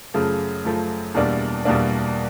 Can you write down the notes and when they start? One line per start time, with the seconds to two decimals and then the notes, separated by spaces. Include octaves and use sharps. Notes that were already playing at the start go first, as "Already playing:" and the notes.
0.14 F#2 C#3 F3 A3
0.65 F#2 C#3 F3 A3
1.14 E2 B2 G3 A#3 D4
1.65 E2 B2 G3 A#3 D4